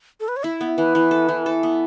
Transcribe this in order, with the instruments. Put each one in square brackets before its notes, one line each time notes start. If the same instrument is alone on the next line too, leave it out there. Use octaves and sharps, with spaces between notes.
[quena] A4
B4
C#5
[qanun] E4 [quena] E5
[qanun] B3
[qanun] E3 [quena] B4
[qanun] E3
A4
E3
A4
B3